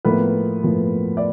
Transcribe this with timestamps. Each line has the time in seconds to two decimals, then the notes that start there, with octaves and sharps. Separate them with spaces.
0.05 A2 F3 A#3 B3 B4
0.64 A2 F3 A#3
1.17 D5